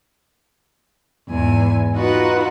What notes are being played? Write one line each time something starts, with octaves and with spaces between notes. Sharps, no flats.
E2 G#2 G#5
D#4 F4 F#4 B4 F#5